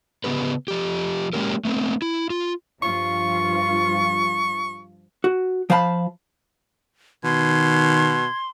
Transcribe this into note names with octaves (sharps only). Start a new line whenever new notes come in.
C#3 B3 G4 B4
F3 G4
G#3 A#3 C#4 G4 A#4
A3 B3 C4
E4
F4
G2 F3 F4 C#6
F#4
F3 C5 F5 A5 B5
B2 D#3 C6 G#6